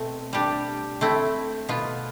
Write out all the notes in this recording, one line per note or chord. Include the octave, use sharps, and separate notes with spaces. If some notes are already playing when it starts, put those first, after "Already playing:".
Already playing: B2 A3 C4
G3 D4 G4
A3 C4 E4
B2 B3 F4